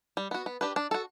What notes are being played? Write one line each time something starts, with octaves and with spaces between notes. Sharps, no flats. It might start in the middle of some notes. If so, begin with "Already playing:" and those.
G3
B3 F#4
B3
D4 G4 B4
D4
F#4 A4